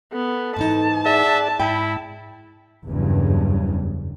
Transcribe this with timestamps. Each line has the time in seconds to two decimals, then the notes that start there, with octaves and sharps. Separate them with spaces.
0.12 B3 A4
0.56 G#2 E3 D#4 A5
1.05 G#4 D5 E5 F#5
1.60 G#2 E4 G5 B5
2.86 F#1 E2 G2 C#3